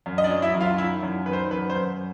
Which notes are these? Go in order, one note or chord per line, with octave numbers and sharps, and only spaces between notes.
F#2
D#5
D4 D5
F#3
E4 E5
F#2
F4 F5
D#3 E4 E5
F#2
D#3 B4
C5
F#2 B4
C5
F#2